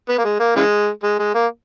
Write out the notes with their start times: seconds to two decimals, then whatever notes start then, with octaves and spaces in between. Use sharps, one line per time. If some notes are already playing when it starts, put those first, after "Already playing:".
0.09 B3
0.18 A#3
0.24 G#3
0.40 A#3
0.56 C#3 E3 G#3
1.03 G#3
1.19 G#3
1.35 A#3